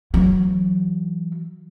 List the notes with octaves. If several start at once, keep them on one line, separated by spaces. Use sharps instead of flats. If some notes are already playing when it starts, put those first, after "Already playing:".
E3 F#3